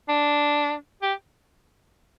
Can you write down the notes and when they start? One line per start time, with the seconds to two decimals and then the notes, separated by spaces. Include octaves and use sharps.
0.08 D4
1.02 G4